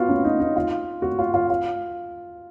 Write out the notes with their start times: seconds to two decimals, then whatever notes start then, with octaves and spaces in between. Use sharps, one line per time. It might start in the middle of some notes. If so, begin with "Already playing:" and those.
Already playing: B3 F4 F#4
0.09 C#4
0.25 D#4
0.40 D#4
0.56 F4
1.02 F#4
1.19 F4
1.34 F4
1.50 F4